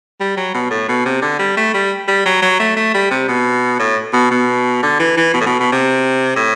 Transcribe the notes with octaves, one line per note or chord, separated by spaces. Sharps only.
G3
F#3
B2
A2
B2
C3
D3
G3
A3
G3
G3
F#3
F#3
A3
A3
G3
C3
B2
A2
B2
B2
D3
E3
E3
B2
A2
B2
B2
C3
A2